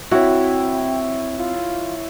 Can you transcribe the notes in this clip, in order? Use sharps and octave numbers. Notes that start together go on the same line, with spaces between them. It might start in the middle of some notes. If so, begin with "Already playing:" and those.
C4 E4 F#4 C#5 G5
F4